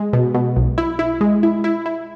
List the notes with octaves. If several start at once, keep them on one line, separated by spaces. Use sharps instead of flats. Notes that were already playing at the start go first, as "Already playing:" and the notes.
Already playing: G#3
B2
B2
B1
E4
E4
G#3
E4
E4
E4